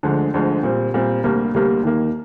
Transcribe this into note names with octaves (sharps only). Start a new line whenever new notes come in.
D2 D3 F3 G#3
D2 D3 F3 G#3
A#2 G3 C4
A#2 G3 C4
D2 C3 G3 A#3
D2 C3 G3 A#3
D#2 D#3 A#3